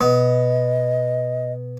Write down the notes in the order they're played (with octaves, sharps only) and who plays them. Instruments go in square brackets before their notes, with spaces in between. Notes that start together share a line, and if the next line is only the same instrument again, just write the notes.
[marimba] B2 [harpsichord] B3 [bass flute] D#5